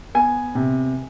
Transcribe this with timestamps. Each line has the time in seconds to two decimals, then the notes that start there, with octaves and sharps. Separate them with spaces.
0.15 B3 G#5
0.55 C3